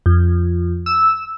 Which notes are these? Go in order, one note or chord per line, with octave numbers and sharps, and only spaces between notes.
F2
E6